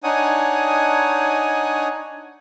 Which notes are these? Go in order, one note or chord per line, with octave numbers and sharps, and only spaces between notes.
D4 D#4 C#5 F#5 G#5 D#6